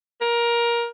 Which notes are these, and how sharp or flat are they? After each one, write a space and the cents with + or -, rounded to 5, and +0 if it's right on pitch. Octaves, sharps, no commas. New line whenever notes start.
A#4 +20